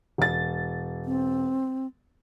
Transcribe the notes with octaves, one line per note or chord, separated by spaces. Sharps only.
E1 A6
C4